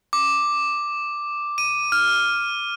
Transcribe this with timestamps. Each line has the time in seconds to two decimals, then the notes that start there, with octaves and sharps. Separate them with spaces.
0.13 D6
1.58 D#7
1.92 F6